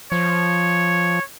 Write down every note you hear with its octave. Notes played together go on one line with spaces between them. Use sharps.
F3 C#5